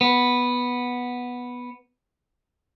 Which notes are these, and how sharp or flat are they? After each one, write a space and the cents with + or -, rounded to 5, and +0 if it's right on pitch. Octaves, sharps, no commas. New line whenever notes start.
B3 -5